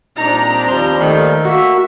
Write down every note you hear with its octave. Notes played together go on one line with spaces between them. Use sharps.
A#2 G3 C4 D4 D#4 A#5
D#2 F3 G3 C5
D#3 A3
A#3 F#4 E5